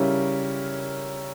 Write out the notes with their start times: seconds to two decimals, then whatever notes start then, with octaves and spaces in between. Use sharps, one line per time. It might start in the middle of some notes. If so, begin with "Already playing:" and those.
Already playing: C#3 G3 C#4 E4 A#4